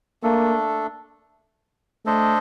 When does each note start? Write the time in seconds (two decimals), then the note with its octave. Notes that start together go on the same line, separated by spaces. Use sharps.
0.23 A3 A#3 D4 A4
2.05 A3 D4 A4 C5 D#5